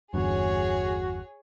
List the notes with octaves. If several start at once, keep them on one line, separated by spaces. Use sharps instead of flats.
G1 E2 G2 F#4 G#4 C#5